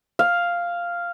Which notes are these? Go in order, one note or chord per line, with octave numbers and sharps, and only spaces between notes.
F5